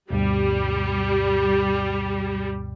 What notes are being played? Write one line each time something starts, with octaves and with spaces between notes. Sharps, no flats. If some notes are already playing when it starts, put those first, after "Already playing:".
D2 G2 B2 G3